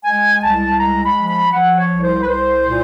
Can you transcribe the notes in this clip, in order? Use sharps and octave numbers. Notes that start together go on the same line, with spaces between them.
G#3 G#5
C2 A5
G#3 A#5
B5
F3
B5
F3 F#5
C#5
C2
C5
B4
C2 C5
A#2